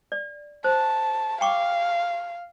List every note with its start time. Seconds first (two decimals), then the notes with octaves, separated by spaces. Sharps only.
0.12 D5
0.64 C5 A5
1.41 F5 G5 C#6 D6